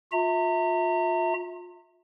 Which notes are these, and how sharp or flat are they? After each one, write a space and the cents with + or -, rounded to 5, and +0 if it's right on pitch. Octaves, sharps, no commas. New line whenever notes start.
F4 +30 E5 -20 A#5 -35